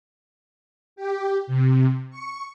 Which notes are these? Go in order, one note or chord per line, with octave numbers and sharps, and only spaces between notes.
G4
C3
C#6